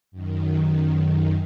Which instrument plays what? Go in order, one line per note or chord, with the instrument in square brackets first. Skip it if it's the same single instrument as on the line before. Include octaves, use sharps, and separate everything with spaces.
[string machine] F#2 D#3